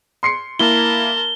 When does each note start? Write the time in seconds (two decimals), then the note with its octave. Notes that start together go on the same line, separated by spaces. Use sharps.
0.23 C6 C7 C#7
0.59 A#3 E4 A#4 A5 G7